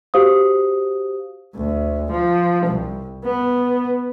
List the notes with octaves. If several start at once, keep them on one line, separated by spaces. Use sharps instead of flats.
F#4 G4 C5 F5 D#6
D2
F3
C2
B3